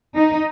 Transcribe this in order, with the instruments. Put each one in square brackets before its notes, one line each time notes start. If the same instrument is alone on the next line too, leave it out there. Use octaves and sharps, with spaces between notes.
[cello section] D#4